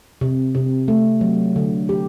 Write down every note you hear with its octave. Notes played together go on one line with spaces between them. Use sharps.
C3
C3
A3
F#3
D3
G4